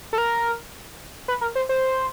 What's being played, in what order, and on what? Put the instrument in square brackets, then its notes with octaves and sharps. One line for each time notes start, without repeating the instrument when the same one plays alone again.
[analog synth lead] A4
A#4
B4
A#4
C5
C5